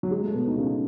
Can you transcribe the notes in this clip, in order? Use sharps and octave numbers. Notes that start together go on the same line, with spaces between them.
F#3
G#3
A3
B2 B3
D#4
C#3 C#4